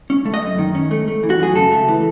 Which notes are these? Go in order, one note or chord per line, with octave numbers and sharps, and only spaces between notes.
C#4
A3
D#5
F#2
D#3
C#4
A3
A3
E3
F#4
F#2 G#4
C#3 A4
A3
E3